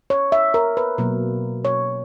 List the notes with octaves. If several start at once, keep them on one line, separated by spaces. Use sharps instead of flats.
C#5
E5
A#4
B4
B2 F#3 A#3
C#5